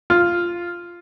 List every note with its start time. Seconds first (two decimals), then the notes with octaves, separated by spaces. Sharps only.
0.10 F4